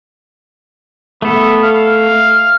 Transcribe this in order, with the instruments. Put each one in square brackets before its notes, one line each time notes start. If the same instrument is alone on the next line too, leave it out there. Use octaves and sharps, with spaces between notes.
[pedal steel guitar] A3 A4 [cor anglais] B3
[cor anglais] F5